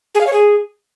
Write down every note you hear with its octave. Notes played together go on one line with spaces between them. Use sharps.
G#4
F5
C#5
G#4